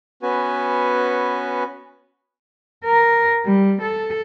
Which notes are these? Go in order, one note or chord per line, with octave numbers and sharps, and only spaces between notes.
B3 C#4 F#4 B4 G#5
A#4
G3
A4